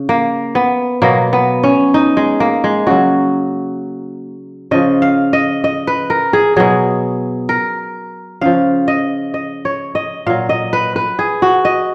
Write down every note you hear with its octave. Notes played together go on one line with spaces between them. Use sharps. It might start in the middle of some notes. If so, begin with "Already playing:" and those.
Already playing: C#3
A#3
B3
B2 F#3 A#3
B3
C#4
D#4
G#3
A#3
G#3
C#3 F#3 F#4
C#3 F3 D#5
F5
D#5
D#5
B4
A#4
G#4
B2 F#3 G#4
A#4
C#3 F3 F5
D#5
D#5
C#5
D#5
A#2 F#3 F5
D#5
B4
B4
G#4
F#4
D#5